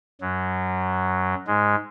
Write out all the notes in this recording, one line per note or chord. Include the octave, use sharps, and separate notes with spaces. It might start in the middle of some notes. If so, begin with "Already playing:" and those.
F#2 F#3
G#2 G#3